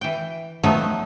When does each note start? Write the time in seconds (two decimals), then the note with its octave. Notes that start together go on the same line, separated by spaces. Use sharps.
0.01 E3 G5
0.63 F3 F#3 A3 B3 C4 D#4